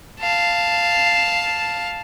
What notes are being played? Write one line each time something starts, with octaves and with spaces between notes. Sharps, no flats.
F5 A5